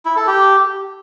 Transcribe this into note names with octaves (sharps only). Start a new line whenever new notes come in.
E4
A4
G4